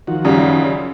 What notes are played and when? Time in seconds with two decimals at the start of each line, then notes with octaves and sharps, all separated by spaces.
0.07 D#3 F3 F#4
0.24 F#2 C#3 G3